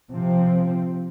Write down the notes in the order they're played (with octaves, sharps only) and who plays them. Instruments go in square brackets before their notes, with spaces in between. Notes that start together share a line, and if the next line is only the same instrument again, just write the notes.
[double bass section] C3 F3 C4